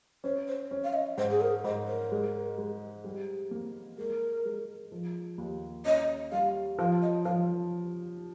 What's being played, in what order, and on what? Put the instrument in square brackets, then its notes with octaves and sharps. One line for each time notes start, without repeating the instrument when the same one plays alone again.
[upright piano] C#4 [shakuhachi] C5
[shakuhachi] C5
[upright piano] C#4
[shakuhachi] F5
D#5
[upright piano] G#2 [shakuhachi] C5
[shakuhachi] G#4
A#4
[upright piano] G#2 [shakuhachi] C5
[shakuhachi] A#4
[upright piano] G#3
G#3
G3
A#3
[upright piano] G#3 [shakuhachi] A#4
[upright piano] G#3
F3
D#2
[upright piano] C#4 [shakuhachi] D#5
[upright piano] G3 [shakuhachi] F5
[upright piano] F3 [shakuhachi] F5
[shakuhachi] D#5
[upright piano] F3 [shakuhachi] F5